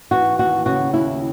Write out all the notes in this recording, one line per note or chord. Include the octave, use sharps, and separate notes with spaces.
E3 F#4
D#2 F#4
C#3 F#4
D#2 E4